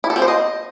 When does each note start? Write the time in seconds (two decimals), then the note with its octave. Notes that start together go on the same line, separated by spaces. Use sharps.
0.04 E4
0.10 A4
0.16 C4
0.22 C5
0.28 D#5